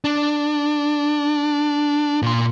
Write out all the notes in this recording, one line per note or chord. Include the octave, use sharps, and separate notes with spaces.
D4
A#2 C6